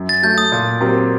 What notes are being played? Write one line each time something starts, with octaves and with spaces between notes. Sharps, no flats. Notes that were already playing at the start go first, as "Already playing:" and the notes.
Already playing: F#2
A6
F#3 A3 G6
D#6
A#2
F#3 C4 G4 A#4